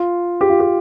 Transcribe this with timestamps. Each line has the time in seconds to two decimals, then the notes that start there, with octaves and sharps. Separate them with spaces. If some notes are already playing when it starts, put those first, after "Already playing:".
Already playing: F4
0.41 G4
0.50 F4
0.60 G4